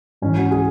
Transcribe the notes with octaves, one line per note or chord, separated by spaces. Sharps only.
G#2 E3 C#4
F#4
G#4